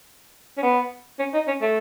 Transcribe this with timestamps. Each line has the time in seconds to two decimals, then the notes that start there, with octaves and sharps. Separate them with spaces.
0.57 C#4
0.63 B3
1.19 C#4
1.34 D#4
1.47 C#4
1.61 A3